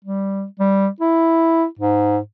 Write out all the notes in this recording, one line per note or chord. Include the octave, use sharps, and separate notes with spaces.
G3
G3
E4
G#2